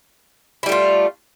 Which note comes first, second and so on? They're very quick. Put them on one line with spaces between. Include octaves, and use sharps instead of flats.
E4 G3 A3 F4